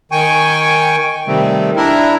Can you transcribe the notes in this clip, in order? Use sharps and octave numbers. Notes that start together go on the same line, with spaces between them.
D#3 G5 G#5 C#6
C3 D#3 G3 A3 C4
D4 E4 A#4